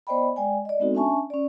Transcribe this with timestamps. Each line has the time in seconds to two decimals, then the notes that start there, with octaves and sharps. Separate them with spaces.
0.07 B3 C5 D5 D#5 G5 B5
0.36 G#3 D5 G5 G#5
0.65 D5 D#5
0.79 G#3 B3 C4 D#4 F#4 A4
0.95 C#4 D4 E5 G#5 A5 C#6
1.30 C#4 D5